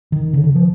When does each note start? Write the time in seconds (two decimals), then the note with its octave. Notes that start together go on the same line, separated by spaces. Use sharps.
0.12 D#3
0.33 C#3
0.44 D#3
0.55 F3